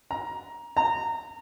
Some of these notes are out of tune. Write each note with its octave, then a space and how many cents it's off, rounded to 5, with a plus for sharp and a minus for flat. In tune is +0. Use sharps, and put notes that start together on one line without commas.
A#5 +15
A#5 -20